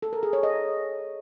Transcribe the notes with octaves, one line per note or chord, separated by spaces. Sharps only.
A4
A#4
G#4
C#5
D#5